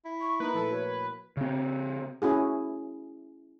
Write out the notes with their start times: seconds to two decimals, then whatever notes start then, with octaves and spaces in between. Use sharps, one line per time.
0.05 E4
0.20 C#6
0.40 A#3 D#4 B4
0.53 A#2 F3 A3 A4
0.71 F#4 A#4 C#5
0.89 E4
1.37 C#3 C4
2.22 C#4 E4 F#4 G#4